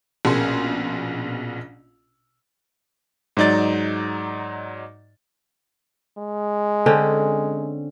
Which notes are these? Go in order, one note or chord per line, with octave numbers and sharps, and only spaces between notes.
A#1 B2 A#3 C#4 G#4 C6
G#2 F#3 D#4 D5 A6
G#3
D3 C4 C#4